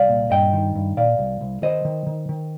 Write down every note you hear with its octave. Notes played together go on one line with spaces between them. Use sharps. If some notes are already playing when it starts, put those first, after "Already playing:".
Already playing: C2 D5 F5
A#2
G2 D#5 G5
D#3
G2
A#2 D5 F5
C2
C2
D#3 C5 D#5
D#3
D#3
D#3